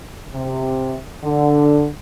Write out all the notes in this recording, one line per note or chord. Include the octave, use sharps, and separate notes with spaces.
C3
D3